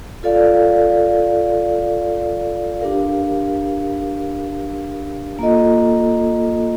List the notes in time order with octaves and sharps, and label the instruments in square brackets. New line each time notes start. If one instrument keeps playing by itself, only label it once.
[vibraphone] F4 A4 D5 F5
D4 G4 A#4 F5
A#3 F4 A4 D#5